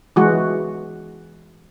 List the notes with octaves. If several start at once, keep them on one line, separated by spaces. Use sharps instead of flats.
E3 G#3 F#4